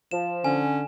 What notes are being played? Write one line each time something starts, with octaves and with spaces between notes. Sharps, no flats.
F3 E7
D3 C#4 G#5